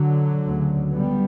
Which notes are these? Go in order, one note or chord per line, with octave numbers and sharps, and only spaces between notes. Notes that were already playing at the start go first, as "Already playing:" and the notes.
Already playing: D3 F#3
D2 C#3
G3 B3